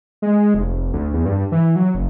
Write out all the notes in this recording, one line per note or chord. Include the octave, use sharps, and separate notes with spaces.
G#3
F1
D2
E2
G2
E3
F#3
F#1